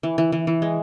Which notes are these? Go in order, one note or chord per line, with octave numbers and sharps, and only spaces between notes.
E3
E3
E3
E3
G#3